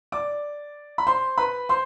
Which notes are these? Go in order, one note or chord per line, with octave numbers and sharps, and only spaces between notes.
D5 D6
B5
C5 C6
B4 B5
C5 C6